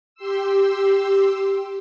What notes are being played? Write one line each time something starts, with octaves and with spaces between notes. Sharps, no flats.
G4 C6 E6